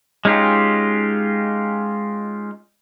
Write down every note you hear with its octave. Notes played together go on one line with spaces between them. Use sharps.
G#3 C#4 D#4 F4 G4